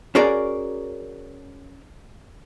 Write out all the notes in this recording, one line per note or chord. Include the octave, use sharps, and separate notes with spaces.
C#4 F#4 G#4 A#4 D5